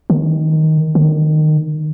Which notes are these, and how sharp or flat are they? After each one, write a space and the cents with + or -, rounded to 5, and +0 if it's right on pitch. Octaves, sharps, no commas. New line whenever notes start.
D#3 +10
D#3 -20